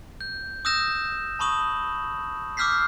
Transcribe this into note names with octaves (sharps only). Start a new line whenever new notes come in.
G6
D#6 E6 F#6 G6 A#6 E7
A5 B5 C#6 D#6 F#7
D6 E6 F6 G6 B6 C7